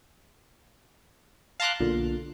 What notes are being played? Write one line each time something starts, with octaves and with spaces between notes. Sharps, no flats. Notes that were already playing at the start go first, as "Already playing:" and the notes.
F5 A5 A#5 C6 D6 F#6
B1 A#2 D3